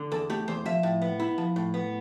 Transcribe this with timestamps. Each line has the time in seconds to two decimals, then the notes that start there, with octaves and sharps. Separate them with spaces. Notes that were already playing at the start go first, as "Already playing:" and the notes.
Already playing: D3
0.12 E2 A4
0.30 A3 G4
0.48 E2 C5
0.66 F3 E5
0.83 A2
1.02 B3
1.20 E4
1.38 F3
1.56 A2
1.74 B3